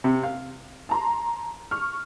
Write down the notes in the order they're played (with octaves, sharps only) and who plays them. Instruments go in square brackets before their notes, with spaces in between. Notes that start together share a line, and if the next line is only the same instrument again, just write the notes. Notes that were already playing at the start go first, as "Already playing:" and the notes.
[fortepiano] C3
F5
[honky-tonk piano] A5 A#5 C6
C#6 F6